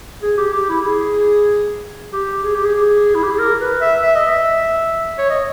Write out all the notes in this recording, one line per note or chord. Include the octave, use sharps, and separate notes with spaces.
G#4
G4
G4
E4
G#4
G4
G#4
G4
G#4
E4
G4
G#4
A#4
B4
E5
E5
D#5
E5
C#5
D#5